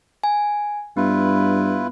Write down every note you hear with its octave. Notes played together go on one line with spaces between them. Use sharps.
G#5
G2 B3 E4 F4 B4